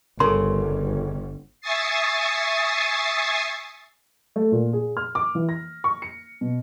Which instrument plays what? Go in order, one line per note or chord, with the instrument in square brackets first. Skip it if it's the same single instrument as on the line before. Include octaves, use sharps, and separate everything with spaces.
[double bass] G1 G2 [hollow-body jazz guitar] C#3 [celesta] A4 A#4 [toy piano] C6
[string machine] E5 G#5 C#6 D#6 A6 C7
[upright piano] A3
A#2
G#4
F6
D6
E3
A#6
C#6
C#7
B2